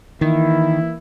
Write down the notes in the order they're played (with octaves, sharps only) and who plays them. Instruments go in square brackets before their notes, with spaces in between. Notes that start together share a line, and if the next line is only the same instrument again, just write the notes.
[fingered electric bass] D#3 [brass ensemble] E3 A#3 E4